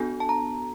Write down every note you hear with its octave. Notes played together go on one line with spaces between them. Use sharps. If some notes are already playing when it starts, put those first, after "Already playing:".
Already playing: B3 D4 F#4 A4 G#5
A5
A#5